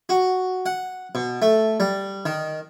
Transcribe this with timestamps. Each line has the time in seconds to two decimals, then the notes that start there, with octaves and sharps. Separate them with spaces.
0.09 F#4
0.66 F#5
1.15 B2
1.42 A3
1.80 G3
2.25 D#3